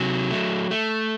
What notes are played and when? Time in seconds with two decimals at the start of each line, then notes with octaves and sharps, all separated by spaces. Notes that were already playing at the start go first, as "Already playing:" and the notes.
Already playing: C3 F#3
0.31 A3
0.71 A3